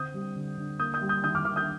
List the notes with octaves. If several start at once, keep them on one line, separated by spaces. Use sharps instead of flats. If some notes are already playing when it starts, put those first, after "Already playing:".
Already playing: D3 C4 D#6 G6
G3
D3
D3
A#3 D#6 G6
D#6 G6
G3
D#6 G6
D#3 D#6 G6
D6 F6
D#3 D6 F6
D#6 G6